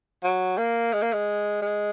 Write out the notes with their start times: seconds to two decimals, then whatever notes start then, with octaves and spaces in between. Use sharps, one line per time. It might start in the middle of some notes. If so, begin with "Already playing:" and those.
0.24 F#3
0.58 A#3
0.93 G#3
1.02 A#3
1.13 G#3
1.62 G#3